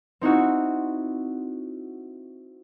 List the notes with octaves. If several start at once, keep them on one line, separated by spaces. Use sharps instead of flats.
C4 D#4 E4 F#4